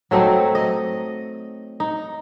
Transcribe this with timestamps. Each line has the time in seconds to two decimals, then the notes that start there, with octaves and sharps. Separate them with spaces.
0.11 F#3 A3 C4 D#4
0.55 D#5
1.80 D#4